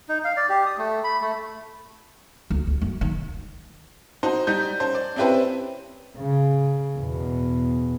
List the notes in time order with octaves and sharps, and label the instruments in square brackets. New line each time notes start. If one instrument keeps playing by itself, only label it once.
[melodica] D#4
F5
D5
G4
D#6
A3
B5
A3
[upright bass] D2
D2
F#2
D#3
[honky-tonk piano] D#4 F#4 C5
G3 D#4 G6
C#4 C5
D5
C4 C#4 E4 G4 B4 C5
[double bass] C#3
E2 B2